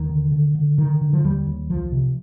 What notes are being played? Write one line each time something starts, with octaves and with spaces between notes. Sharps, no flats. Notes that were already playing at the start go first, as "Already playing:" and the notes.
Already playing: D#2 D#3
D3
D3
D3
D3 D#3
D3
F3
D#2 G3
D#2
C2 F3
C3